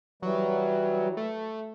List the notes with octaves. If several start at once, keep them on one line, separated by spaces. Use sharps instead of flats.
E3 F#3 G3
A3